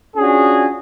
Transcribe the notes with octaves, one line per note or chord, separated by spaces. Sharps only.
C#4 D4 F4 F#4 G#4